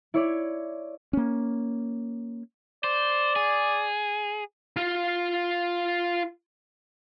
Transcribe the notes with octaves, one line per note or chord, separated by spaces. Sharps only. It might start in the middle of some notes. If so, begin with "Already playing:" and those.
E4 C#5 D5
A#3 C#4
C5 D5
G#4
F4 F5